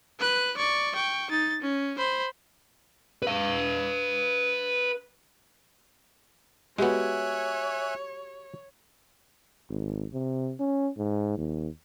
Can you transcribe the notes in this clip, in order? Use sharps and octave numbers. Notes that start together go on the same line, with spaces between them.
B4 F#6
D5 C#6
G5 C#6
D#4 A6
C#4
C5 B5
B4 F5
G#3 B3 F#4 G4 C#5 E5 G#5 F#6
G#1
C3
C#4
G#2
D#2